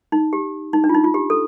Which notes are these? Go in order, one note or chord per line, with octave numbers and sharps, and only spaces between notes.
D#4
G4
D#4
D4
F4
D#4
F4
G4
A4